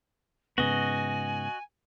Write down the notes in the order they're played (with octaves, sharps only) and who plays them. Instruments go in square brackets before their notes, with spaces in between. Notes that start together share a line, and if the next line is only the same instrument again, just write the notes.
[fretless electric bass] G#2 C#3 B3 [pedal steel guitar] F#4 D#5 [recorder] G#5